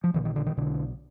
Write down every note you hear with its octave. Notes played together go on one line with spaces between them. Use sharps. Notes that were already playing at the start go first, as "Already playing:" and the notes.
F3
A#1 A#2 D3 E3
D#3
D3
D#3
B1 B2 D3